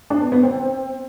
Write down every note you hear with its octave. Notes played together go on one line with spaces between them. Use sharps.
D4
B3
B3
C4